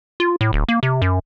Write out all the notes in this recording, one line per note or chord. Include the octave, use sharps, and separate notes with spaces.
F4
A2
D1
A#3
C3
F#2